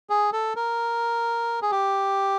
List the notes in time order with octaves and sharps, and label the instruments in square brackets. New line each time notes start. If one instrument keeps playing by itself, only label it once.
[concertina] G#4
A4
A#4
G#4
G4